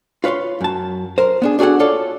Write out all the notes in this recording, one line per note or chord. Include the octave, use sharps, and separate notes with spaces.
F4 B4 C#5 F5 C6
F#2 A5
A#4 C5
B3 D4 G#4
D4 F#4 G#4 A4 F#5
F4 A4 C#5 D5